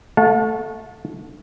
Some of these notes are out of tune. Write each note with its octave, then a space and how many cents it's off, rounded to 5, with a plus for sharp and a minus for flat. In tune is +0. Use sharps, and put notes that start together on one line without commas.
A3 +0 F#5 -45 A5 -10